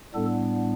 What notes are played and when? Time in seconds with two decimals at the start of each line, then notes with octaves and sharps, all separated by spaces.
0.14 A2 G3 B3 D4 A4